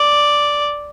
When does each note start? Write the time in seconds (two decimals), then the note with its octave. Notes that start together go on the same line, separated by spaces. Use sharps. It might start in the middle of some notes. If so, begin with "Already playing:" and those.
Already playing: D5